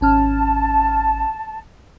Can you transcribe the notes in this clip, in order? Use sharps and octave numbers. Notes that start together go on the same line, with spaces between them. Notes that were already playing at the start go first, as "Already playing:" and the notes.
G#1 C#4 A5 F6